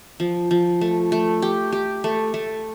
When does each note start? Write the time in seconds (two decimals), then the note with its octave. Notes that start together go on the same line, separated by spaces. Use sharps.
0.20 F3
0.51 F3
0.81 A3
1.12 A3
1.42 G4
1.72 G4
2.04 A3
2.34 A3